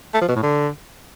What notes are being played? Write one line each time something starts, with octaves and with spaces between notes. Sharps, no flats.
A3
F3
B2
A2
D3